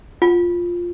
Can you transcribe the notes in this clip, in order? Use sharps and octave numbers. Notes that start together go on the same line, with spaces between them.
F4